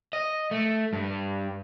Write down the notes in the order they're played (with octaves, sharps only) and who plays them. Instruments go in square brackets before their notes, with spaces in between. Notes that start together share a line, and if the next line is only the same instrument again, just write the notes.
[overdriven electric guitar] D#5
A3
G2